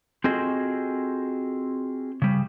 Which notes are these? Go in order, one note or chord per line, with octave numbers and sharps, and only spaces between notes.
C4 F4 F#4 G#4 A4 D#5
C#3 G3